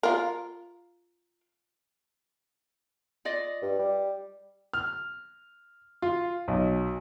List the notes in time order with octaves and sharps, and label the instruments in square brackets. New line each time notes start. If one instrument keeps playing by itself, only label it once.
[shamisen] F4 A#4
[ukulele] F4 D5 D#5
[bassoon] G2
G3
[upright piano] F6
F4
B1